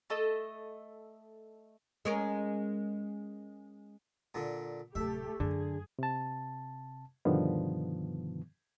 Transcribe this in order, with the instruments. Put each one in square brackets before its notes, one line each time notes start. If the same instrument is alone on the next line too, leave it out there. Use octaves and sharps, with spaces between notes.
[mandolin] A3 A4 D#5
[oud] G#3 C#4 A#4
[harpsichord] A#2 D3
[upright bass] D1 C3 [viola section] A3 G4 A4 [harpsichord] E5
[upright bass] F#2 [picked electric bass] D3 [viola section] G#4
[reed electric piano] C3 A5
G2 B2 D3 D#3 F3 B3